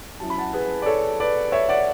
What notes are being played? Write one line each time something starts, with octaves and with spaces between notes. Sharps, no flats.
F#3 C#4 E4 A5
B5
F#5 A5
G#4 B4
D5
A4 C#5
B4 D5
C#5 E5
D5 F#5